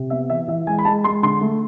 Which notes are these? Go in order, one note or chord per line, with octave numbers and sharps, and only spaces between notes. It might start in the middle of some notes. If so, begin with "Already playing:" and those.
Already playing: C3
B3 E5
E3 E5
E3 E5
G#3 G#5
B5
G#3 A5
G#3 C6
D3 C6
A3